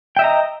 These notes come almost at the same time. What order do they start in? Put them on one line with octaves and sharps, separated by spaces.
G5 E5 D#5 A#5